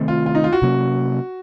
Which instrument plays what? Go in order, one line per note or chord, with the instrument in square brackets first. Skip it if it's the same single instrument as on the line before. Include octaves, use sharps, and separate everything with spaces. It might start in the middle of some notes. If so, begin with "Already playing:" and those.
Already playing: [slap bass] C3 D#3 A3 C4
[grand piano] F4
F4
D#4
F4
F#4
[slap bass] C3 F#3 A#3 C#4